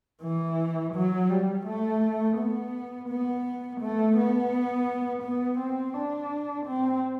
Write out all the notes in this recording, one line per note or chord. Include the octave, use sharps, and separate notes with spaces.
E3
F#3
G3
A3
B3
B3
A3
B3
B3
C4
D4
C4